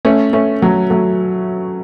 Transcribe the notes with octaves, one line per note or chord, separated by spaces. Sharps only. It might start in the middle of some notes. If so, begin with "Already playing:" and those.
A3 C#4
A3 C#4
F#3 A3
F#3 A3